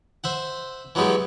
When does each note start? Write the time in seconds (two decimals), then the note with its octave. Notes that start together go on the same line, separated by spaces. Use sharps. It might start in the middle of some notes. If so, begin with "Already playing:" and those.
0.24 C5 E5 F#5
0.95 E3 F#3 G#3 B3 G4